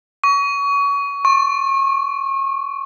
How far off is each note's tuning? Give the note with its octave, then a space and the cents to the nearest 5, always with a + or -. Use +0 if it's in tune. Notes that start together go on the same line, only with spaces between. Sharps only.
C#6 +30
C#6 -35